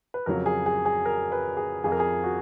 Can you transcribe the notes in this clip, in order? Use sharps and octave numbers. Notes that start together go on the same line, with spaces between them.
B4
F2 C#3 F#3 A#4
G#4
G#4
G#4
A#4
B4
G#4
F2 F3 G#4
A#4
G#4
F#4